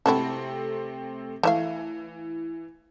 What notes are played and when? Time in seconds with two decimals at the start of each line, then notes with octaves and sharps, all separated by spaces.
0.06 C3 A3 C4 E4 F#4 A4
1.43 E3 A3 E5 F5